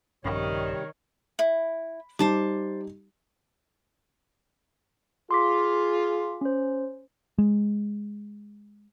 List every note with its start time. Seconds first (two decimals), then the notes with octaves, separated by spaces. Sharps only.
0.25 A#1 G2 C3 D#3 G3 C#4 C#5
1.39 E4
2.19 G3 D#4 C5 A5 D6
5.31 F4 G#4 C6 D6 B6
6.41 C#4 C5
7.38 G#3